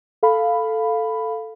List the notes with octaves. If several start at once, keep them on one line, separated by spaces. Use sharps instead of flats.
A4 F5 B5